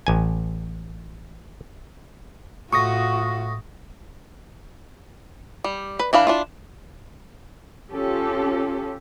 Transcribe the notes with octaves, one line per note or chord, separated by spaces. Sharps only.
A1 G#5
A2 F4 F#4 C#6 D#6 A#6
G3
B4
E3 D4 F5 B5
D4 E4 F4
C#4 F4 G4 A4